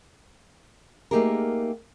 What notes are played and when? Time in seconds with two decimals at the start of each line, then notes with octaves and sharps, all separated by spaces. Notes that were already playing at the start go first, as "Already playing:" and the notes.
1.11 A3 A#3 D#4 G4 G#4 A#4